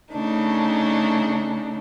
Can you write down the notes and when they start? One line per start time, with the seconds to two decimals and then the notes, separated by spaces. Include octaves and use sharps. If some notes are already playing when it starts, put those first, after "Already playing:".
0.12 C#3 A3 D4 D#4